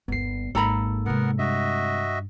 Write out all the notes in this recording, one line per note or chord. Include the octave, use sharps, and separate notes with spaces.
G1 D#2 B3 C7
G#1 G#2 A#3 A4 A#5 B5
C3 G#3 B3 A#4 F#5
G2 F#4 D#5 E5